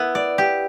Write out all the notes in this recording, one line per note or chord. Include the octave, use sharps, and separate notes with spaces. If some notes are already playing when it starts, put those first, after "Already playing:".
Already playing: B3 E4
D5
G4